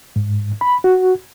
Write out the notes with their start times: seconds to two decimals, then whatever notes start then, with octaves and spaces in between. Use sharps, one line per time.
0.16 G#2
0.61 B5
0.84 F#4